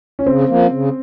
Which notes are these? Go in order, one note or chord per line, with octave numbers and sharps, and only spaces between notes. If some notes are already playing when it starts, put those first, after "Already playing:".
C#4
C#3 C4
F3 A#3
C#3